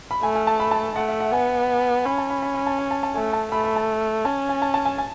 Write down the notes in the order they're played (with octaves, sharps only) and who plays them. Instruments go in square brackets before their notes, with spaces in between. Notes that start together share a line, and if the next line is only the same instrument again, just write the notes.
[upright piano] B5
[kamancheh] A3 [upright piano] G#5
[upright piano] G#5
A5
B5
A5
[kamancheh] A3 [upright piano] F#5
[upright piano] E5
F#5
[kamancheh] B3 [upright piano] G#5
[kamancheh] C#4 [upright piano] B5
[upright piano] A5
B5
B5
B5
A5
G#5
A5
A5
[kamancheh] A3 [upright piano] G#5
[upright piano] A5
[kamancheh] A3 [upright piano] B5
[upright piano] B5
A5
[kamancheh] C#4 [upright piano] A5
[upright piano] G#5
A5
A5
G#5
G#5